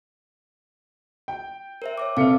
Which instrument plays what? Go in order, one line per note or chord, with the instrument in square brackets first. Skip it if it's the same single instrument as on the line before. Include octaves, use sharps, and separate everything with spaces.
[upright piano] G5
[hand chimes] A#4 C5 E5
C#5 E5 D6
[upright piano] C3 A4 C#7 [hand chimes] B4 F5